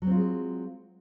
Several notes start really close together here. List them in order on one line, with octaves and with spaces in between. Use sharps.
F#3 C4 F4 G#3